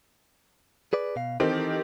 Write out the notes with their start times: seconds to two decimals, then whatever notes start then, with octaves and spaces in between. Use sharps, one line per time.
0.93 G#4 B4 D5
1.16 B2 F5
1.40 D#3 E3 C4 D#4 G4 A4